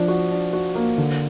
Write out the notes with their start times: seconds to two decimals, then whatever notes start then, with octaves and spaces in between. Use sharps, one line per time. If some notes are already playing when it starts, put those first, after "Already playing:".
Already playing: F3 D4
0.08 F#4
0.31 D4
0.53 F#4
0.75 A#3
0.98 D3